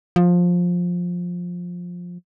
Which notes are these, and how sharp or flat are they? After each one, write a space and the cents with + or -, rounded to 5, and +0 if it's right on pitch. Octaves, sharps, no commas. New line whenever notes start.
F3 +15